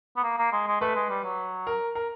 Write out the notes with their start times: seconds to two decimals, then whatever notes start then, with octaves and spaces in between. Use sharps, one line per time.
0.17 B3
0.24 A#3
0.38 A#3
0.52 G#3
0.67 G#3
0.81 A3 B4
0.96 G#3
1.09 G3
1.24 F#3
1.67 A#4
1.95 A#4